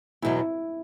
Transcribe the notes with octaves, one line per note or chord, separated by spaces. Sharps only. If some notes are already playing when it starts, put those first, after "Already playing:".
E2 B2 F#3 E4
E4